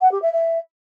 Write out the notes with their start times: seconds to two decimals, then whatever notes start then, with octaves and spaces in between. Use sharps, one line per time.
0.01 F#5
0.12 G4
0.22 E5
0.32 E5